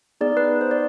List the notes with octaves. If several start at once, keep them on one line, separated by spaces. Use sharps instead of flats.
B3 D#4 G#4 D5
B4
C5
D5